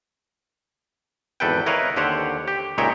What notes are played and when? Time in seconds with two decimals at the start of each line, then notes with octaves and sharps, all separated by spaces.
1.40 G#1 E2 A4 B4 G5
1.66 E4 A#4 B4 C#5 D#5 F5
1.96 D#2 D3 G4 C5 C#5 F#5
2.48 G4
2.78 C#2 A#2 D#4 C#5 E5 G5